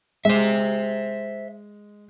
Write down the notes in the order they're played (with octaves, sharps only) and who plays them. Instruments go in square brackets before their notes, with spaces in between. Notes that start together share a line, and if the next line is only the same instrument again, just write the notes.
[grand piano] G#3 [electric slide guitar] C5 E5